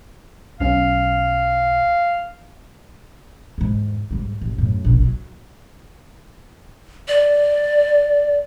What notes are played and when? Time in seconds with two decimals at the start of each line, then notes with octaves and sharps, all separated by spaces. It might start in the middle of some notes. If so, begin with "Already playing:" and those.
0.60 B1 C#4 F5
3.58 E2 G#2
4.11 G#2 G3
4.41 A1
4.58 F#2 A2
4.85 A#1 B2
5.01 F#3
7.08 D5